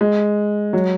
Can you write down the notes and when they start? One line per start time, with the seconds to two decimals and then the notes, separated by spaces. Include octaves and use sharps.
0.01 G#3
0.73 F#3